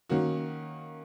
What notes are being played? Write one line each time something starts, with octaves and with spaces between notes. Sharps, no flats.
D#3 A#3 C#4 F#4